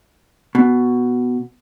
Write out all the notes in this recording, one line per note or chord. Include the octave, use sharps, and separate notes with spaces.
B2